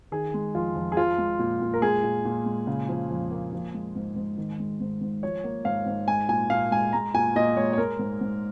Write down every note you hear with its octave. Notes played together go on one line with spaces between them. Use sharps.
D#3 G#4
G#3
F2 F4
F2
G#4
F3 F4
G#3
A#2
A#2
A#4
G#3 G#4
A#2
A#2
G#3
C#3
F3
F2
A#3
F3
G#3
G#2
G#2
D#3
G#3
G#2
G#2
F3 C#5
A#3
G#2 F5
G#2
G#3 G#5
A#2 G#5
A#2 F5
G#3 G#5
G#3 A#5
A#2 G#5
A#2 D#5
G#3 C#5
C#5
G#3 A#4
G#2
G#2